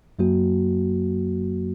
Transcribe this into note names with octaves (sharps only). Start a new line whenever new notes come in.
F#2 F#3 A#3 F#4